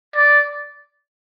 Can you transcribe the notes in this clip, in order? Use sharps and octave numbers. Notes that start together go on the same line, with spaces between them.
D5